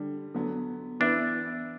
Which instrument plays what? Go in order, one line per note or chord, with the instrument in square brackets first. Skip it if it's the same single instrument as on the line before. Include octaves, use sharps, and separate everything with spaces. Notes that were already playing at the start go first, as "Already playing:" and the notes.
Already playing: [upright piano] D3 G3 D4
D3 F#3 B3
[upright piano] E3 B3 E4 B4 E5 [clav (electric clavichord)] D4